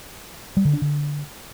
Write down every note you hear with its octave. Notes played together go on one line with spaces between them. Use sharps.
G3
D3
D4
D3